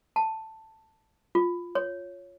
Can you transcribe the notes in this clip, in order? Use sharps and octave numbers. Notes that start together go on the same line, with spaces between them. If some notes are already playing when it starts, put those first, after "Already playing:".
A5
F4
C#5